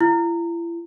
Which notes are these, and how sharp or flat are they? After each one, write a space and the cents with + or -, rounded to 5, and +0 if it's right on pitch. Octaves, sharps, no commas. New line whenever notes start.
E4 +40